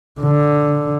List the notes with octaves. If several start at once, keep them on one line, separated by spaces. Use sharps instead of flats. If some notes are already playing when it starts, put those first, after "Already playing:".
D3